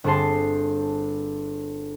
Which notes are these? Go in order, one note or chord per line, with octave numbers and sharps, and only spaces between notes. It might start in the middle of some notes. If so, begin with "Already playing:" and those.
G1 C4 G#4 A5 C6